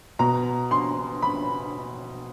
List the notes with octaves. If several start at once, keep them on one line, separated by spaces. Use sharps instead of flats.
B2 A#5
C6
B5